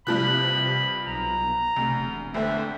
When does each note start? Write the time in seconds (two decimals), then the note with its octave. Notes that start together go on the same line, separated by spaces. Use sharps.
0.07 G2 C3 F3 B5 F#6
1.07 B1 A#5
1.76 D2 C3
1.96 E1
2.34 D2 D3 C4 E5